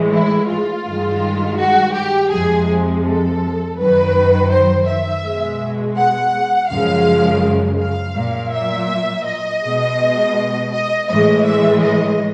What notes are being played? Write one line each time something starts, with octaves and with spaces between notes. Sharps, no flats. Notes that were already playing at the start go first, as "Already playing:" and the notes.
Already playing: A2 E3 G#3
E4
F4
G2 D#3 G#3
F#4
G4
F2 C3 F3 G#3 G#4
A4
F#2 D#3 F#3 B4
C5
E5
B2 G#3
F#5
F#2 C#3 F3 G#3 F5
F5
A#2 F#3
E5
D#5
B2 G#3
D#5
A2 E3 G#3 D#5
E5
D#5